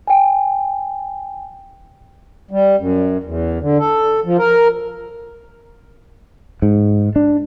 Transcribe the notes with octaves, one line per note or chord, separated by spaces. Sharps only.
G5 G#5
G3
F#2
E2
D3
A4
F3
A#4
G#2
D4